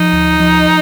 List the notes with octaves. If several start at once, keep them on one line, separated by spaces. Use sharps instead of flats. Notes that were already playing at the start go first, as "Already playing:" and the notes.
Already playing: F3 D#4
D2
F3